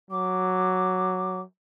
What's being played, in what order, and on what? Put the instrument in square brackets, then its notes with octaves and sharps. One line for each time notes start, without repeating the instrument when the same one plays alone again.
[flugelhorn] F#3 [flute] D6